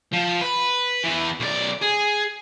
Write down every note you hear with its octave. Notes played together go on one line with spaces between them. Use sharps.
F3
B4
E3 B3
B1 D5
G#4